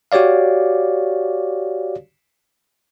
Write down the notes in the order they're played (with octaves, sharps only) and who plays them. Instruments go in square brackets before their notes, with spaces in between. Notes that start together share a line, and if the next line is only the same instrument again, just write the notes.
[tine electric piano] F#4 G4 C#5 D5 F5